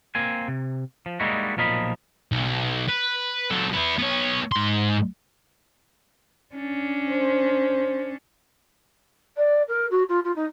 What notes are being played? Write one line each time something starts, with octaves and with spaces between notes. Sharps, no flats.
A#3 C4 G#5
C3
F3
G3 G#3 A#3 D#4 E4 F#4
B1 A#2 F3 A#4 D#5 B5
B1
B4
F#3 A4
B3 E4
B3 C#5
G#2 C6
C#4 D4
C5
D5
A#4
F#4
F4
F4
D#4